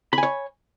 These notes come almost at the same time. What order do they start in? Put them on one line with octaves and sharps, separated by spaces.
B5 G#5 C#5